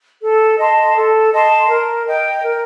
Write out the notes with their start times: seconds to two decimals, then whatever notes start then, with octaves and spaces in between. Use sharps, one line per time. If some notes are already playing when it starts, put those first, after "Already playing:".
0.21 A4
0.59 D#5 A5 C6
0.96 A4
1.32 D#5 A5 C6
1.68 A#4
2.06 D#5 G5
2.42 A#4